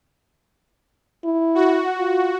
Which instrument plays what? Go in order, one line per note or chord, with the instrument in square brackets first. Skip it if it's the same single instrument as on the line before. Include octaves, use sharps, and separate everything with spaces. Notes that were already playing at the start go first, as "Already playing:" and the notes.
[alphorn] E4
[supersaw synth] F#4
[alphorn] F4